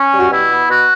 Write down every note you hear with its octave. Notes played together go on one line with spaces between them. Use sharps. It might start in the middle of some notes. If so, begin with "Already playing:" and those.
Already playing: C#4
G3
F#4
B2 E4
B3
B2 F#4